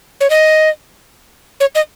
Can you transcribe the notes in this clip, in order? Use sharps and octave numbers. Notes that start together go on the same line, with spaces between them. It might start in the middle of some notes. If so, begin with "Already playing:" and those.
C#5
D#5
C#5
D#5